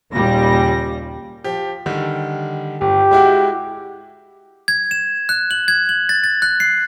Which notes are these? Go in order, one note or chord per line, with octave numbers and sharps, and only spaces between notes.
D#2 A#2 C#3 G3 A#6
F3 G4
D3 D#3 G3
G1 G4
G#3 E4 F#4
G#6
E7
F#6
F#7
G#6
F#7
A6
A6
F#6
C7